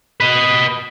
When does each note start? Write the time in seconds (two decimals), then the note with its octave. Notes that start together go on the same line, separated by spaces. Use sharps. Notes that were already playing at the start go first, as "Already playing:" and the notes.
0.21 B4 D#5